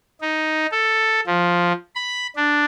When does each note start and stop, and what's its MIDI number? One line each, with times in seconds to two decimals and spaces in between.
0.21 0.66 63
0.71 1.20 69
1.27 1.73 53
1.96 2.27 83
2.36 2.65 62